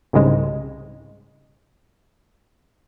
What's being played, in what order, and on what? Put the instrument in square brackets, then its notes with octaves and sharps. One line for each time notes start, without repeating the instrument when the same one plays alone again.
[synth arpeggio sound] C2 G#2 C#3 G#3